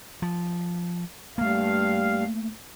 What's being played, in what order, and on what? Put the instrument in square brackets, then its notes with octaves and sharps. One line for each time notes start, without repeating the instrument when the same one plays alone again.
[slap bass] F3
[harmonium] G2 F5 [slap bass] A3 A#3